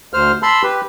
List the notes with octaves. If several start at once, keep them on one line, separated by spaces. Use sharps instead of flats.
D2 C5 F6
A5 B5 C6 E6
G4 B4